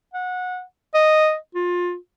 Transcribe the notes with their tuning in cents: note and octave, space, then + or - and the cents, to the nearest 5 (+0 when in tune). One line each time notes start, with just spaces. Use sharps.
F#5 -20
D#5 -5
F4 +20